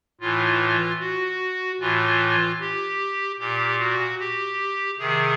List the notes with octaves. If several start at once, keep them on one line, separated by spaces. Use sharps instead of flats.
A2 E3 F4
F#4
A2 E3 F4
G4
A#2 G4
F#4
G4
C3 D#3 G#4